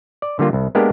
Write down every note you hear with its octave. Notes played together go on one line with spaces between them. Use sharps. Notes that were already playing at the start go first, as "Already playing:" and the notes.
D5
D3 G3 A#3 F4
C2
G#3 A#3 B3 D4 G4 A#4